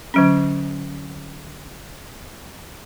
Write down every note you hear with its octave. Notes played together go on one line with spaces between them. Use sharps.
D3 F#3 C#4